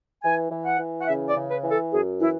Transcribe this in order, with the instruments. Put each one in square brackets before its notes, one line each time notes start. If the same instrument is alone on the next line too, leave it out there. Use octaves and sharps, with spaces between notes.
[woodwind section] E3 G#5
E3
F#5
E3
F#5
C#3 E5
D5
C#3
B4
E3
A4
F#2 G#4
E3 E4